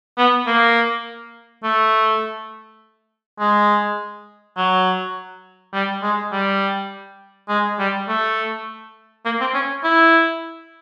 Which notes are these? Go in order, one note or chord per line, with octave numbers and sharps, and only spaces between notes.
B3
A#3
A3
G#3
F#3
G3
G#3
G3
G#3
G3
A3
A#3
C4
C#4
E4